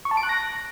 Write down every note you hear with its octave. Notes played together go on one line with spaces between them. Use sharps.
C#6
A5
D7
F#6
A#6